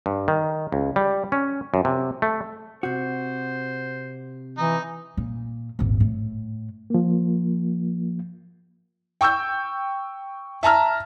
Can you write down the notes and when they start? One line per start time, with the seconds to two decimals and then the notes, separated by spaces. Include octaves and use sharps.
0.06 G2
0.28 D#3
0.72 C#2
0.96 G3
1.32 C#4
1.74 F#2
1.85 C3
2.22 A3
2.83 C3 F#4 C5
4.58 E3 D#4
5.17 A#2
5.79 D#1 G#1
6.00 A2
6.90 F3 A#3
9.21 G5 C#6 E6 G6
10.63 E5 A5 A#5 F6